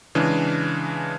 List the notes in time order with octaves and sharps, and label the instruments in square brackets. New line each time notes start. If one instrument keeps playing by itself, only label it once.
[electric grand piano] C#3 E3 G#3 D4